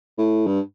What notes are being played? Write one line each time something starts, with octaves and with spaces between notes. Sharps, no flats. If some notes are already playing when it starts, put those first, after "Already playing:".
A2
G2